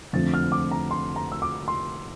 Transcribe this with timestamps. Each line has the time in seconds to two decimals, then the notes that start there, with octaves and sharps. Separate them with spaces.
0.13 F2 D3 F3 A3 C4 A6
0.34 F6
0.52 D6
0.71 A#5
0.91 C6
1.16 A#5
1.32 E6
1.42 D6
1.68 C6